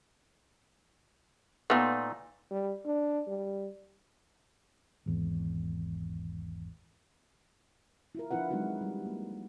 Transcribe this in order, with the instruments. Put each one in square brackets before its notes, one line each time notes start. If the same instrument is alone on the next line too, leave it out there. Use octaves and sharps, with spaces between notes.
[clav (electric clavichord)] A#2 A3 D#4 [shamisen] B3 F4
[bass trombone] G3
D4
G3
[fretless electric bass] G#1 E2
[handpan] E4 F4 A#4
F3 D4 E4 F4 B4 F#5
F#3 G#3 C4 D#4 E4 F#4
G3
A#3